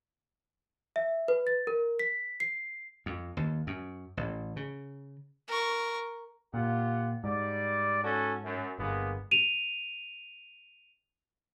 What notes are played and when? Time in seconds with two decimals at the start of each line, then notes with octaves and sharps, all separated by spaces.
0.96 E5
1.28 B4
1.47 A6
1.67 A#4
1.99 B6
2.40 C7
3.06 F2
3.37 D#2
3.67 F#2
4.17 A1
4.56 C#3
5.48 A#4 C#6
6.54 A#2 F4 G4 F#5
7.24 G#2 G3 D5
8.03 C#4 F#4 A4
8.45 F#2
8.79 G1 G#3 A#3 B3
9.31 D#7 F7